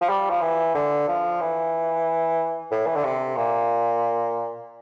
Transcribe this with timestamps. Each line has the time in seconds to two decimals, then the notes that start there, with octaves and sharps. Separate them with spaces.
0.01 F3
0.10 G3
0.30 F3
0.41 E3
0.75 D3
1.08 F3
1.41 E3
2.72 A2
2.86 E3
2.96 D3
3.04 C3
3.36 A#2